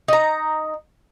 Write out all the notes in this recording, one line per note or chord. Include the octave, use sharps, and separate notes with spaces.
D#4 A#5